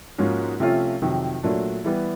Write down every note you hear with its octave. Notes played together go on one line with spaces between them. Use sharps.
G#2 F3 A#3 C#4 F#4
C3 F3 A3 C#4 F4
F2 C3 D#3 F#3
A#2 F#3 A3 D4
E3 G3 B3